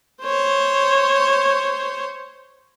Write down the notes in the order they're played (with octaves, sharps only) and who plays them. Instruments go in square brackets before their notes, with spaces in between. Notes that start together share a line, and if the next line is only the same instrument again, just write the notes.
[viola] C5 C#5